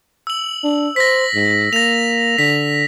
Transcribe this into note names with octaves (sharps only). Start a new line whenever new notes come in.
E6 F#7
D4
C5 A#6 B6
G#2
A#3 A#6 F7
D3 B6